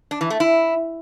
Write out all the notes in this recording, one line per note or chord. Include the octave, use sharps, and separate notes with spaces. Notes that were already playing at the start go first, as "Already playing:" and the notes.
D4
E3
A3
E4